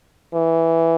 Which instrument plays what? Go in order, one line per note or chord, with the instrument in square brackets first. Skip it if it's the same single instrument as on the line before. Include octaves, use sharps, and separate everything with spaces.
[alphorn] E3